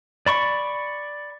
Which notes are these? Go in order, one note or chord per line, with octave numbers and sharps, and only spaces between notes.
D5 B5 C#6